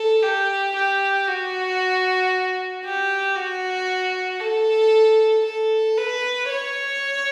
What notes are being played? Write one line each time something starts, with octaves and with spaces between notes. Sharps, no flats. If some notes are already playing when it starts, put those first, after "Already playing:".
Already playing: A4
G4
G4
F#4
G4
F#4
A4
A4
B4
C#5